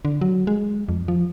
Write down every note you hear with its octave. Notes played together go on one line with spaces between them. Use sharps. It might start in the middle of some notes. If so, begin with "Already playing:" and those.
D3
F#3
G#3
F2
F3